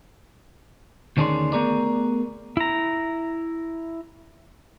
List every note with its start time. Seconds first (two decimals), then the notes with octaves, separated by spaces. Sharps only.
1.17 D2 D#3 C#4 D4 G#4 C6
1.53 A3 B3 G#4 A#4 D5
2.57 E4 A#5